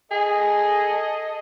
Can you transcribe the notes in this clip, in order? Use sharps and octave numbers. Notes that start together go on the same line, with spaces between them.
G#4 A4 D#5